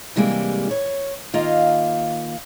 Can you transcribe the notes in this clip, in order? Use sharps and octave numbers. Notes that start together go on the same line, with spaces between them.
C3 E3 G3 G#3 A#3
C#5
D#3 A#3 F4 D#5 F5